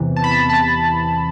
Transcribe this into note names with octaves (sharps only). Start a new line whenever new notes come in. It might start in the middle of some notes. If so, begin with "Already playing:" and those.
Already playing: E2 C3 E3
A5
B5
A5
A5